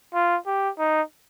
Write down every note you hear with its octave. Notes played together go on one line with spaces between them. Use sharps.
F4
G4
D#4